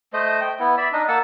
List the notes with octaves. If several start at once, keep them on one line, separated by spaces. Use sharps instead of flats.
A3 C5 D#5
G5
B3 E4
D5 E5 B5 E6
D4 D#4 D#5
A#3 F#5 A5 E6